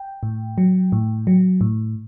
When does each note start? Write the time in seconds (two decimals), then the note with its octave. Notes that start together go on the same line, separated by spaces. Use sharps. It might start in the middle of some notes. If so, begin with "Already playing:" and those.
Already playing: G5
0.23 A2
0.58 F#3
0.92 A2
1.27 F#3
1.61 A2